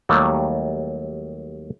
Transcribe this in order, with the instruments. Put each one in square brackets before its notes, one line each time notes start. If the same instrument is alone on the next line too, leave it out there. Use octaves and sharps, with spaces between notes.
[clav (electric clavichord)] D#2 D#3 F#3 G3 A3